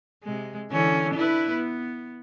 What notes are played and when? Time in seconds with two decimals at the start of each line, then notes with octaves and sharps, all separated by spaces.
0.23 C3 G#3
0.71 D3 E3 C#4
1.14 D4 E4 B4
1.52 B3